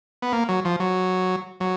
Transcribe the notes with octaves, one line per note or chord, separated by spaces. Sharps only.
B3
A#3
F#3
F3
F#3
F#3